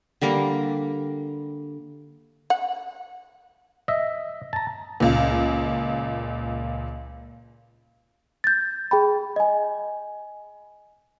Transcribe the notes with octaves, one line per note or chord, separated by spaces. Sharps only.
D3 G3 A#3 A#5
F#5
D#5 E5
A5 A#5
C#2 A#2
G6 A6
G#4 G5 B5
D#5 G#5